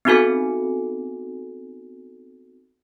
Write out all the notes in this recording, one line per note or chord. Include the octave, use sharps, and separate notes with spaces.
B3 C4 D#4 F#4 A4 G#5